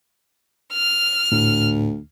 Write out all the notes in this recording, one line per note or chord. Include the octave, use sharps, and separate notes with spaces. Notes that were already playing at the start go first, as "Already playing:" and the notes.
F6
D2 A2